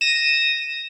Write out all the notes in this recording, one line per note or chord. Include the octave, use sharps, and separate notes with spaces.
A#6 D#7 E7